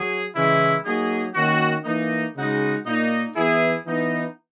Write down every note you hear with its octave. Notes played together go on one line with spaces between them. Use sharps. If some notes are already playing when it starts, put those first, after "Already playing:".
Already playing: F#3 G#4
C#3 E3 G#3 C#4 E4
F#3 A#3 D#4 G#4
D#3 A#3 C#4 F#4
E3 A#3 D#4
C#3 G#3 D#4 F#4
A#2 A#3 D#4
E3 B3 E4 G#4
E3 B3 D#4